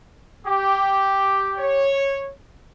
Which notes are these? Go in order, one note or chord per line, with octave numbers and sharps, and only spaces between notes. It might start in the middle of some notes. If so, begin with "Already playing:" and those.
G4
C#5